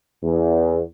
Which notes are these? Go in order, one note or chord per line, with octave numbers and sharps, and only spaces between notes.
E2